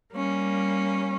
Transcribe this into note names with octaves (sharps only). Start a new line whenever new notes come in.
G3 A#3 C#4